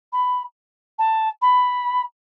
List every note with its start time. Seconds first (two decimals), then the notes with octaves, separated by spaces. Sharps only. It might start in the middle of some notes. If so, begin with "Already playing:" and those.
0.13 B5
0.99 A5
1.42 B5